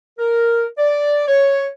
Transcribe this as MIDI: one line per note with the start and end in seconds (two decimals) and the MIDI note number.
0.18 0.66 70
0.78 1.26 74
1.27 1.68 73